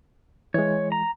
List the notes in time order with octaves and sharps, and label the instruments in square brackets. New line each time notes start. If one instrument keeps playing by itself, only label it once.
[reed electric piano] E3 G#3 [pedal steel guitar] C#5
[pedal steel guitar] A#5